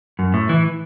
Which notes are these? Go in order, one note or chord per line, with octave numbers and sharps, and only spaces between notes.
F#2
A2
E3